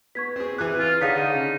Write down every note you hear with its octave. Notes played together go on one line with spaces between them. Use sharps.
B3 C#6 G#6 B6
C4 G#4
E3 G#4 D6 F#6
F4
D3 D4 D#4 G#4 C#5 F5 B6
C#3